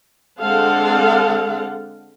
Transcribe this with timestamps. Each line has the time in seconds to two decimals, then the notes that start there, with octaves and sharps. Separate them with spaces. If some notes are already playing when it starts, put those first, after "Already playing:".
0.40 D3 G#3 C4 A4 F5 F#5